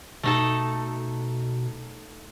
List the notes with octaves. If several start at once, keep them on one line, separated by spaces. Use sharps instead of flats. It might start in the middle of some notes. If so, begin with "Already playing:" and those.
B2 A3 D#4 A4